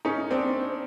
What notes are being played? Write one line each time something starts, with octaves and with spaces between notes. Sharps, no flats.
C#4 D#4
C4 D4